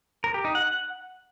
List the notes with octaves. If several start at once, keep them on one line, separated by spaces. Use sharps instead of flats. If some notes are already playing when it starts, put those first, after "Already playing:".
A#4
G4
D#4
F#5